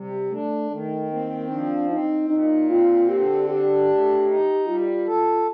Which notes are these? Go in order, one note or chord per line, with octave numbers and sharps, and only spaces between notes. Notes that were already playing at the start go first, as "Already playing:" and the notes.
Already playing: C3 G3
A3 D4
D#3 A3
A#3 C4
F3 D4
C4 D#4
A#2 D#4
C4 F4
D3 G4
D4 G4
A2
D#4
G3 F4
A4